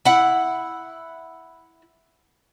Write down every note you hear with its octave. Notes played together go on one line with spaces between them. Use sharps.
E4 F#5